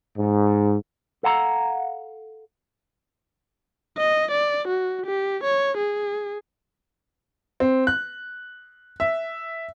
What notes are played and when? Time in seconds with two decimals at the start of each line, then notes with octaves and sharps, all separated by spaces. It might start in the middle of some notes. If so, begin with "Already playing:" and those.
0.17 G#2
1.23 A4 F5 F#5 A5 A#5
3.98 D#5
4.31 D5
4.68 F#4
5.06 G4
5.43 C#5
5.77 G#4
7.60 C4
7.87 F#6
9.00 E5